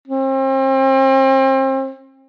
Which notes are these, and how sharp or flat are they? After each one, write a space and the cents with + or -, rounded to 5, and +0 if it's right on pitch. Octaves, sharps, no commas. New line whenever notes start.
C4 +35